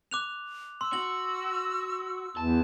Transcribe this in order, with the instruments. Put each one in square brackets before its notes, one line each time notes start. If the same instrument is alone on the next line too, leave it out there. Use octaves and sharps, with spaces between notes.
[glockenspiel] D6 F#6 F7
[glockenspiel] C6 [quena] E6
[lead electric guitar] F#4 [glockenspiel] F#7
[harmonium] E2 [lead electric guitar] A5